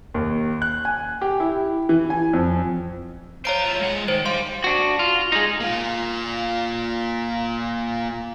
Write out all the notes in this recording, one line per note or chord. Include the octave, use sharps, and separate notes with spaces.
D#2
F#6
G#5
G4
E4
E3
G#5
F2
C5 C#5 F5 A#5 D7
E4 F4
G#3 F#5
D#3 C5
G3 F5 C6
D4 F#4
F4
G#3 D#4
A#3 F4